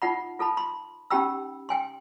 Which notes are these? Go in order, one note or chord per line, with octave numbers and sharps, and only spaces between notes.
D#4 F4 F#5 B5
F4 A4 A5 B5
B5 C6
C#4 D#4 G4 G5 B5 E6
G5 G#5 C6